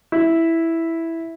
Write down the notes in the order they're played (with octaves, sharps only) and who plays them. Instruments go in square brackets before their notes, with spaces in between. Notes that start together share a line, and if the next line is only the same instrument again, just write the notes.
[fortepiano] E4